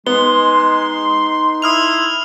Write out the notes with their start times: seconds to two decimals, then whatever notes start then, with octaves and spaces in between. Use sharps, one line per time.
0.07 G#3 B3 D#4 C6 G7
1.62 E4 D#6 F6 F7